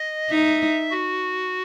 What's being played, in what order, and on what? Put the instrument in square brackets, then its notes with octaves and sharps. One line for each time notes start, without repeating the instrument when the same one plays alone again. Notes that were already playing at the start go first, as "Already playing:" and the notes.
Already playing: [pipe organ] D#5
[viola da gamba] D#4 [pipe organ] E5
[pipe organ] F#4